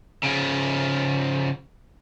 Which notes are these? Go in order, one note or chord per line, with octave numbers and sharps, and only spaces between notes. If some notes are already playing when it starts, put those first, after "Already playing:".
C#3 F3